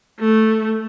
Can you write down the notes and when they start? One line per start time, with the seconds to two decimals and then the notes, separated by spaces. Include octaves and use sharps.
0.20 A3